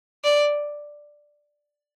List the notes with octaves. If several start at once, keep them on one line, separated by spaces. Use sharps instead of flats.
D5